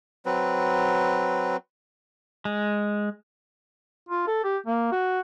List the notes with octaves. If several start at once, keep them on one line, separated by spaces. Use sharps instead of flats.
F#3 C4 B4
G#3
F4
A4
G4
A#3
F#4